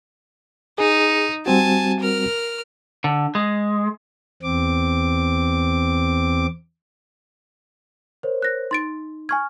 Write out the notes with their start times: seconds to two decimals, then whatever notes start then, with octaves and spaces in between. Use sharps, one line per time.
0.78 D#4 G#4
1.46 G3 C4 F#4 G#5 A5
2.00 A#4 F6
3.04 D3
3.35 G#3
4.43 E2 C4 D6
8.23 A#4 C5 C#5
8.42 F#6 A#6
8.71 D#4 C6 A6 D7
9.29 G#5 C#6 F6 G#6